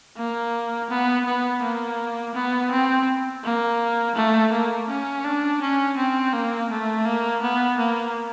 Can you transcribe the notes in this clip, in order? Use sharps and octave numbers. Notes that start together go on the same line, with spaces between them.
A#3
B3
B3
A#3
B3
C4
A#3
A3
A#3
C#4
D4
C#4
C4
A#3
A3
A#3
B3
A#3